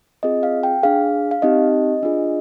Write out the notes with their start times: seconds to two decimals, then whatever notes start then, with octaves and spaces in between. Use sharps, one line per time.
0.23 C4 F4 G#4 D#5
0.43 F5
0.63 G5
0.83 D4 G#4 F5
1.31 F5
1.42 C4 D#4 G4 D#5
2.03 D4 F4 G#4